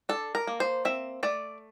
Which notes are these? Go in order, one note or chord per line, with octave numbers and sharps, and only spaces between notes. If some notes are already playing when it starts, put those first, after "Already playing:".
D4 A4
A#4
A#3
C5
C4 E5
A3 D5